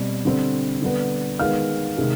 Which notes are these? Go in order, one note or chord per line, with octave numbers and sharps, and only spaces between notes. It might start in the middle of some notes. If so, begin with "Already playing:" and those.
Already playing: B2 G3 C4
D3 G3 C4
D3 G3 B3
D#3 G#3 B3 F5 F6
C3 D#3 G#3 C4